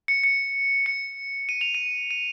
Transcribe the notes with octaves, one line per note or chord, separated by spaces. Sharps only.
C#7
C#7
C#7
D#7
F7
D#7
D#7